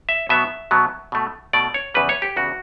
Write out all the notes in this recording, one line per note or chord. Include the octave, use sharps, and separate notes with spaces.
E5
B2 F#3 B3 E5
B2 F#3 B3
B2 A3
B2 A3 D5
C#5
E2 C#3 G3 B4
C#5
G4
E2 C#3 G3 F#4